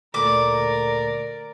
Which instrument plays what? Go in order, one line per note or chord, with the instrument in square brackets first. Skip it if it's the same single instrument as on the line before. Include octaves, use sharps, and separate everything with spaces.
[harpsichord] D2 A#2 B5 [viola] A#4 D5 [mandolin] D6